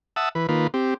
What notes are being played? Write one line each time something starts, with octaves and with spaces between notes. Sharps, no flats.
E5 F#5 A5 D#6 E6
E3 B4
D#3 A#3 F4 B4
C4 G4